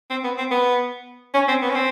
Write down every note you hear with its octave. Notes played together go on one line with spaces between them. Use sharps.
C4
B3
C4
B3
C#4
C4
B3
C#4
C4